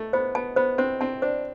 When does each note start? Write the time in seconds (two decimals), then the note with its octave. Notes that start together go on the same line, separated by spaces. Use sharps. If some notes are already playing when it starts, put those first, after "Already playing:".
Already playing: A3
0.13 B3 C5
0.35 B3 A5
0.56 B3 C5
0.78 C4 C5
1.01 C4 A5
1.22 D4 C5